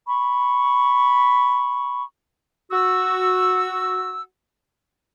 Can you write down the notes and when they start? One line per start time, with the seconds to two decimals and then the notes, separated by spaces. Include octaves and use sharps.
0.08 B5 C#6
2.71 F#4 E6